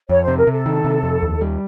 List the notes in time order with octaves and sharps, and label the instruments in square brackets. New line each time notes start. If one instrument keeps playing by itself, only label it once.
[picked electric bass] F2 [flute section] C#5
[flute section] C5
[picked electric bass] C3
[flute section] A#4
[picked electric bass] C3 [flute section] A4
[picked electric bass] D#3
C3
F2
D#2
G3